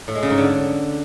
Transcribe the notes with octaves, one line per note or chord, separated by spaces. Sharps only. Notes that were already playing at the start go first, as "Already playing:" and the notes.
A2
G#3
C#3
G#2
D3